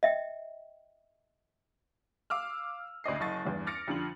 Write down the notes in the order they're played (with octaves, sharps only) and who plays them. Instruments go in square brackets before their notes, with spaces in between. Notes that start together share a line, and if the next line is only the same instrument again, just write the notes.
[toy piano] D#5 E5 G5
[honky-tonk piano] F5 D6 E6 F6
D2 D5 D#5 C7
F#1 D#5 C#6 A6
E2 G2
D6 F6 A6 A#6 C#7 D7
F2 D3 F4 F#7